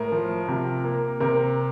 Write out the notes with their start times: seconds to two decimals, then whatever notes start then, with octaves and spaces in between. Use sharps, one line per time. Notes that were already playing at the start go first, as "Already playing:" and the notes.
Already playing: A2 A#4
0.12 F3
0.48 C3
0.85 A#3
1.20 C3 A#4